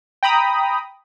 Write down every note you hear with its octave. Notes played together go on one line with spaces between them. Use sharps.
G5 A#5 B5 D#6